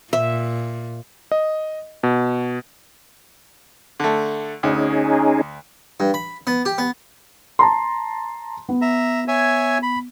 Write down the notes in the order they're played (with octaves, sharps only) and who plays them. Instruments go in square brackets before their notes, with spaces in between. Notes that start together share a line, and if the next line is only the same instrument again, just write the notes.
[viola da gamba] A#2 [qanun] E5
[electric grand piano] D#5
B2
[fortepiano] D3 A3
[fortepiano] D2 [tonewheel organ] C#4 D#4 G#4
[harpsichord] G2
B5
B3
G4
B3
[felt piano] A5 A#5 C6
B3
[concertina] E5 A#5
C#5 E5 G#5
B5